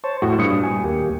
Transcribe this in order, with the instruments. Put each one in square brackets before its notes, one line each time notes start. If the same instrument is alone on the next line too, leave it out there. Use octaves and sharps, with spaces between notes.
[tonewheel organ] C5 C#5 A5
[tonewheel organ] F2 [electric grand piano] A2 F#4
[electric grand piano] G2 D#6 C#7 [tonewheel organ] A#2
[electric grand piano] G#5
[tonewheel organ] D#2 A#3 G4